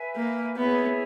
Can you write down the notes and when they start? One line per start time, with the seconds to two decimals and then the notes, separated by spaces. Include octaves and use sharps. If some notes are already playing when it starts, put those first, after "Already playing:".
Already playing: B4 E5 G#5
0.16 A#3
0.56 B3 E4 G#4 C#5 E5